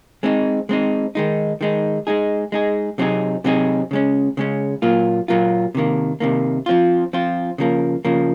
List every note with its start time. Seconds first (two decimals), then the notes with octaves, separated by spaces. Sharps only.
0.23 G#3 C4 D#4
0.69 G#3 C4 D#4
1.15 D#3 G#3 D#4
1.61 D#3 G#3 D#4
2.07 G#3 D#4 G#4
2.52 G#3 D#4 G#4
2.98 C3 F#3 C4 D#4 G#4
3.44 C3 F#3 C4 D#4 G#4
3.91 C#3 G#3 C#4
4.37 C#3 G#3 C#4
4.82 A#2 F#3 A#3 F4
5.28 A#2 F#3 A#3 F4
5.75 C3 D#3 A#3
6.20 C3 D#3 A#3
6.66 F3 C4 F4
7.13 F3 C4 F4
7.58 C#3 F3 A#3
8.05 C#3 F3 A#3